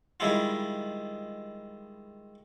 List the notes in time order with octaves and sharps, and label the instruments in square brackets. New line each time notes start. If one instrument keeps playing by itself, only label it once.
[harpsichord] D#3 G3 G#3 E4 F4